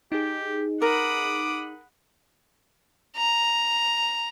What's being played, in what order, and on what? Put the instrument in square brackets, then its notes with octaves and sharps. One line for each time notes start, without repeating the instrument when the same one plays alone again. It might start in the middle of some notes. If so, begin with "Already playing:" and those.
[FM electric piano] D#4 G#4 [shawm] G4
[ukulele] A#4 [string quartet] F#5 B5 D#6 [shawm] D6
[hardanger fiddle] A#5